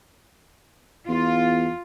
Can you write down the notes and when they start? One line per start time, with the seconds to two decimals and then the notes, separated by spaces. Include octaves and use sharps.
1.09 E2 F4